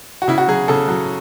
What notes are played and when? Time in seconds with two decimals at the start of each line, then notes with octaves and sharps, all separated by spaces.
0.22 F#4
0.28 C#3 E4
0.38 F#4
0.48 F#3 G#4
0.68 C#3 A4
0.88 F#3